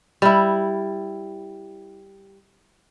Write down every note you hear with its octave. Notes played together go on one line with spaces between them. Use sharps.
G3 E4